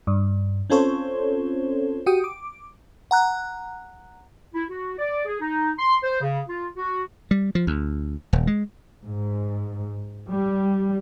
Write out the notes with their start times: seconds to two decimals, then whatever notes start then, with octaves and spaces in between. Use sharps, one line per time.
0.07 G2
0.70 C4 C#4 F4 A4 C5 C#5
2.06 F#4 G4 G5 D#6
2.24 D6
3.11 F#5 A#5 F#6
4.54 E4
4.69 F#4
4.98 D5
5.25 G#4
5.40 D#4
5.78 C6
6.02 C5
6.20 C#3
6.47 F4
6.76 F#4
7.31 G3
7.55 F3
7.67 D2
8.33 D#1
8.47 G#3
9.03 G#2
10.29 G3